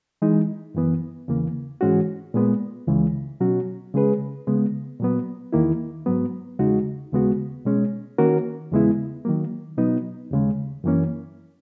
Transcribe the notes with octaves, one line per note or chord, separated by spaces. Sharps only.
E3 G#3 D#4
F#2 E3 B3
E2 C#3 E3 A#3
G#2 E3 G#3 C#4 F#4
A#2 G#3 B3
C#2 C#3 E3 G#3
B2 F#3 C#4 F#4
C#3 G#3 C#4 G#4 B4
C#3 G#3 B3
A#2 F#3 B3
E2 D#3 A#3 E4
G#2 F#3 B3
E2 C#3 G#3 D#4 F#4
D#2 C#3 G#3 B3 F#4
B2 G#3 C#4
D#3 A#3 C#4 F#4 A#4
E2 C#3 G#3 B3 E4
D#3 F#3 A#3
B2 F#3 B3 D#4
D#2 C#3 G#3
F#2 E3 A#3 C#4